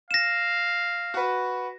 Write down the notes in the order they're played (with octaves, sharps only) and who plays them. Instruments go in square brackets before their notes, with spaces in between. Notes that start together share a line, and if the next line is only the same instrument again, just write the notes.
[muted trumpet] F5 [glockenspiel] A#6 E7
[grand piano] F#4 B4